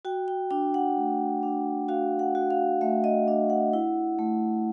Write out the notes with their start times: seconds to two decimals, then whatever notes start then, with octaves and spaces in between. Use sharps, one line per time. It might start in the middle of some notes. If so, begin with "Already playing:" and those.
0.05 F#4 G5
0.28 G5
0.51 D4 G5
0.74 F#5
0.97 A3
1.43 D4
1.88 F#4 F5
2.19 F#5
2.35 F#4
2.51 F5
2.81 A3 E5
3.04 D#5
3.27 D4 D#5
3.50 F#5
3.73 E4
4.19 A3